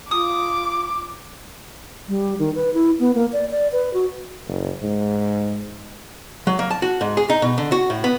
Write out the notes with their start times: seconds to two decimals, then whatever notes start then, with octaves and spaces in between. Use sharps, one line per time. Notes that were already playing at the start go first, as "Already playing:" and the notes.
0.11 F4 D6 D#6
2.08 G3
2.39 D#3
2.55 B4
2.74 E4
3.00 B3
3.15 A#3
3.33 D5
3.51 D5
3.72 B4
3.94 F#4
4.48 F#1
4.82 G#2
6.47 F#3
6.59 A#3
6.70 A5
6.82 F#4
7.01 G#2
7.17 G#4
7.30 D#4
7.42 B2
7.58 D3
7.72 F#4
7.90 A2
8.04 B3